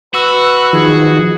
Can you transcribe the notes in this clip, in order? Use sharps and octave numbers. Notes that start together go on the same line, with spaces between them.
F#4 B4 E6
D#3 F3 G#4